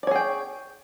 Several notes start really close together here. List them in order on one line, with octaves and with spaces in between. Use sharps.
D5 C#5 G#4 G5